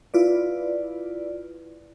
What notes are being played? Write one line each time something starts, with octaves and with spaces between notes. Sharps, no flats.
E4 F4 B4 D5